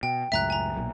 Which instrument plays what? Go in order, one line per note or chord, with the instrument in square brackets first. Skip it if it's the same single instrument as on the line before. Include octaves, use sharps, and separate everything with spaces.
[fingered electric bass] B2 [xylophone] G5
[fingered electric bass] C#2 F#2 A2 [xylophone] E5 A#5 F#6
[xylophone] G#5 A#5
[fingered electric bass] B1 A#2 F#3